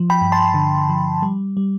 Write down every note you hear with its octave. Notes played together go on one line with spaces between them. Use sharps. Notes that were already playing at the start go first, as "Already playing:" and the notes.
Already playing: F3
G5 B5
G2
A5 C6
D3
F3
G3
G3